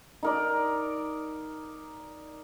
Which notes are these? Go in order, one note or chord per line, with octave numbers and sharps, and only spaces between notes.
D#4 A#4 D5